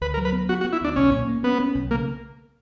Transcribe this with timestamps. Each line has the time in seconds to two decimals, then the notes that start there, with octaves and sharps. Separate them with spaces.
0.01 D2 B4
0.14 A#4
0.17 F#3
0.25 B4
0.33 B3
0.49 B3 F#4
0.61 F#4
0.65 B3
0.73 E4
0.81 D2 D4
0.96 B1 C#4
1.11 A#2
1.28 A#3
1.43 B3 C#4
1.60 C#4
1.75 B1
1.91 C#3 A#3